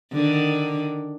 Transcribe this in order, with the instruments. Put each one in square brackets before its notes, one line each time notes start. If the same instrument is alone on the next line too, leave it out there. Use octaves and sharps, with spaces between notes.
[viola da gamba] D3 D#3